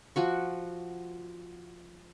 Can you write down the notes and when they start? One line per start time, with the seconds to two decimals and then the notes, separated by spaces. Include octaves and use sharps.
0.16 F3 F#4 C#6